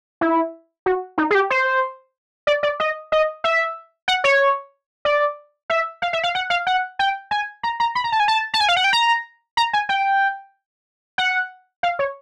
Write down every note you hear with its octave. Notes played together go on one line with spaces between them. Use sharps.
E4
F#4
D#4
G#4
G4
C5
D5
D5
D#5
D#5
E5
F#5
C#5
D5
E5
F5
E5
F5
F#5
F5
F#5
G5
G#5
A#5
A#5
B5
A#5
A5
G#5
A5
A5
G#5
F5
F#5
G5
A#5
A#5
G#5
G5
F#5
F5
C#5